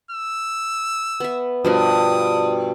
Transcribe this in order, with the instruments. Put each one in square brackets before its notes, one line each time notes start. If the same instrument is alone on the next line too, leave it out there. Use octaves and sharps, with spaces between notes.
[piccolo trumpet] E6
[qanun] B3 E5
[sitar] G2 [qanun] B2 F3 A#4 [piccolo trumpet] D#6